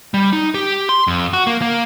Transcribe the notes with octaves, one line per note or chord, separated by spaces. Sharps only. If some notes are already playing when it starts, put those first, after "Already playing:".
G3
D#4
G4
C6
F2
F#4
A#3
A#3